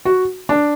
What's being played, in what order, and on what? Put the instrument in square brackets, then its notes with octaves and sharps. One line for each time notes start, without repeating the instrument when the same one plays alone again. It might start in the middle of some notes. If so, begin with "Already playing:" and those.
[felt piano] F#4
D4